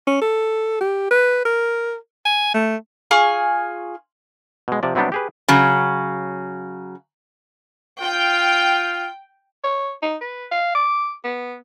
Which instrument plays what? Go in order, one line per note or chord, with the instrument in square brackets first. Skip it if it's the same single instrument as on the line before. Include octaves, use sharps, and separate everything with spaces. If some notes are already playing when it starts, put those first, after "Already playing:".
[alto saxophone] C#4
A4
G4
B4
A#4
G#5
A3
[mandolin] F4 G#4 G#5 C#6
[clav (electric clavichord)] B2 G#3
C3 F3 D5
C3 F#3 G3 B3 D4 G4
G4 G#4 B4
[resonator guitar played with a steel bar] C#3 F#3
[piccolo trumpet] F4 [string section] G5
[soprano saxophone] C#5
D#4
B4
F5
D6
B3